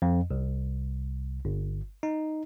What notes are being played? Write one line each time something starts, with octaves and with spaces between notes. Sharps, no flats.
F2
C2
G1
D#4